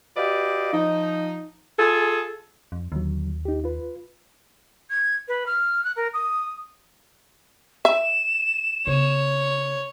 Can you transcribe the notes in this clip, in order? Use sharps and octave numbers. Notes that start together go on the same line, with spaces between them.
F#4 G4 B4 D5 D#5 F5
F3 D#4
F4 G#4 A4
F2
D#2 D3 F#3
D#4 G4
F4 B4
G#6
B4
F6
F#6
A#4
D#6
E5 E7
C#3 B3 C#5